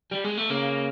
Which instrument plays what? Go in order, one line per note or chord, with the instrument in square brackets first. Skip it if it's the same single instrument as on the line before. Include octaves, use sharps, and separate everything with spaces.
[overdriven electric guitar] G3
G#3
A3
[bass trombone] C#3 [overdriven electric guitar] A#3